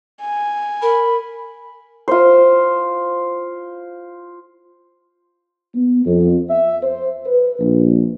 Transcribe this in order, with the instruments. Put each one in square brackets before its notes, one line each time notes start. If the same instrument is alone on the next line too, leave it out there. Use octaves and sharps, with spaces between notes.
[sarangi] G#5
[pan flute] A#4 [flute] B5
[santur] F4 C5
[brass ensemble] B3
F2
E5
C5
B4
A#1